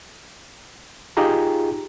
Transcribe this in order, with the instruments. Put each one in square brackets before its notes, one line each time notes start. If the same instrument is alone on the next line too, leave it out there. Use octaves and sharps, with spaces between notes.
[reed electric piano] D#4 F4 G4 G#4 A#5